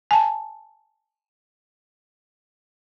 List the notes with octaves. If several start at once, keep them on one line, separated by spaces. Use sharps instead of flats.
G#5 A5